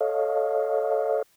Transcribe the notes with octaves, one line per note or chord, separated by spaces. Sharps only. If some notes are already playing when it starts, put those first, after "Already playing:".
A4 C#5 D#5 F5